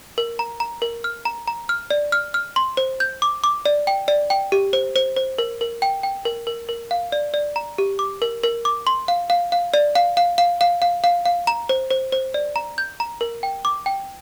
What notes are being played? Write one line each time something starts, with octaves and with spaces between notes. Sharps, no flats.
A#4
A#5
A#5
A#4
F6
A#5
A#5
F6
D5
F6
F6
C6
C5
G6
D6
D6
D5
G5
D5
G5
G4
C5
C5
C5
A#4
A#4
G5
G5
A#4
A#4
A#4
F5
D5
D5
A#5
G4
D6
A#4
A#4
D6
C6
F5
F5
F5
D5
F5
F5
F5
F5
F5
F5
F5
A#5
C5
C5
C5
D5
A#5
G6
A#5
A#4
G5
D6
G5